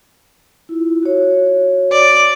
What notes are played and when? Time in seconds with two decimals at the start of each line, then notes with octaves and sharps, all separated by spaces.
0.69 E4 F4
1.03 F#4 C#5
1.92 D5